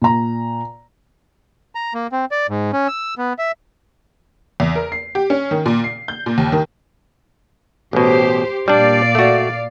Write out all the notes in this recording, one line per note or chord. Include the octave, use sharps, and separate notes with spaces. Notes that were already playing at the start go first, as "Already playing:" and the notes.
A#2 A#5
A#5
A#3
C4
D5
G#2
C#4
E6
B3
E5
E2
A#4
C7
G4
C#4
D#3
A#2
C7
G6
A#2
D#2
D#3
A1 B2 G4 C5
A#2 G3 D4 D5 F5
A3 F#4